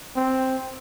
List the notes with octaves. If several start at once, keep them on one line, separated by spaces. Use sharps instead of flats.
C4